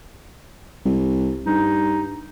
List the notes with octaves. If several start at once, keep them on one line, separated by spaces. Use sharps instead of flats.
C2
G2 D#4